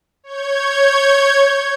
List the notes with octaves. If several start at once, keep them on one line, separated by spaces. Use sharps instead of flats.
C#5 G6 G#6